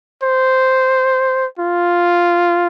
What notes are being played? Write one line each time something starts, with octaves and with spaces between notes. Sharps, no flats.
C5
F4